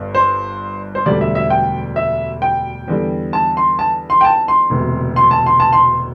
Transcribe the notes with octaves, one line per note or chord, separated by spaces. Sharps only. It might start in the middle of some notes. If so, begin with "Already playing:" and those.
Already playing: G1 G2
C5
C5
E1 D2 D3 G3 D5
E5
E5
G5
E5
G5
E2 D3 G3
A5
C6
A5
C6
G5
A5
C6
E1 D2 C3
C6
A5
C6
A5
C6